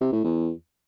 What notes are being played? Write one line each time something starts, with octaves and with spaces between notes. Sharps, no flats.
C3
A2
E2